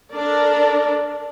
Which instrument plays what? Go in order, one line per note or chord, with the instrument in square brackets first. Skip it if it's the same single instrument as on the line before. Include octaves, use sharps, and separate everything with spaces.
[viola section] D4 A4 A#4 D5